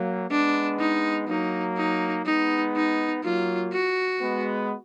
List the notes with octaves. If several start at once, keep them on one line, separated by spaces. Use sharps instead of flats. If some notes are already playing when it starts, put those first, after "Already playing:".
Already playing: F#3 A#3
G#3 B3 D4
D#4
F#3 A#3 D#4
D#4
G#3 B3 D#4
D#4
F#3 A#3 F4
F#4
G#3 B3